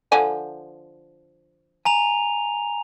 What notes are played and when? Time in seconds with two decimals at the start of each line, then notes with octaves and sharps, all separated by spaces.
0.12 D3 F3 G#5
1.85 G#5 A#5 F7